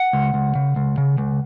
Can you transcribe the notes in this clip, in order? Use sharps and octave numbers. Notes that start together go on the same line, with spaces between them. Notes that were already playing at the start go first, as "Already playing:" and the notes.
Already playing: F#5
C#2
C#2
C#3
C#2
C#3
C#2